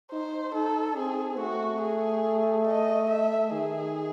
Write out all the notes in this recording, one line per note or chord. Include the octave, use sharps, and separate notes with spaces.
D#4 C5
D#4 A4
C4 G#4
A3 F#4
G#4
D#5
E5
D#3 G#4